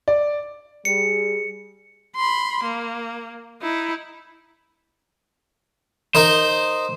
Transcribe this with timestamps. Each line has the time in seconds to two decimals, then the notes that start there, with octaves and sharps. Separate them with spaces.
0.08 D5
0.85 G3 G#4 C#7
2.16 B5 C6
2.64 A#3
3.62 D#4 E4
6.15 D#4 A#4 C5 D#5